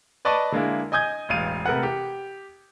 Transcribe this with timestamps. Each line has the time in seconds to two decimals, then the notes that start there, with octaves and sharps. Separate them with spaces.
0.25 B4 D5 D#5 A5 C#6
0.52 D3 G#3 A#3 E4
0.92 D#5 G#5 D#6 G6 G#6
1.29 E1 A1 F5 D#7
1.66 C3 A3 A#4 B4 F#5
1.83 G4